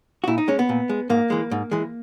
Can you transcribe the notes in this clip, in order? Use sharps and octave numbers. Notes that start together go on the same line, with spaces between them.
F#4
A#2 E4
D#4
G#3 C#4
B3
A#2
G#3
G#2 A#3
E3 G#3
G#2
E3 G#3